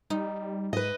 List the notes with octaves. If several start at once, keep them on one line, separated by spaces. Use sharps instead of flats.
G3 D#4
G#2 B4 D#5